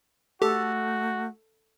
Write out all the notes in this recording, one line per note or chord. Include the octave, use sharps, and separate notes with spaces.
A3 F#4 G4 A4